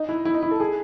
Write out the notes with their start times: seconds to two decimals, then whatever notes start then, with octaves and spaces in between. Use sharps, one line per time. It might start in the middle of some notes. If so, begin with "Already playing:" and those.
Already playing: D#4
0.09 E4
0.25 E4
0.34 D#4
0.43 E4
0.51 A4
0.60 G#4